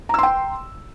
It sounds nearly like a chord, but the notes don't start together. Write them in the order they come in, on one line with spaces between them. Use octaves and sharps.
A#5 E6 C6 G5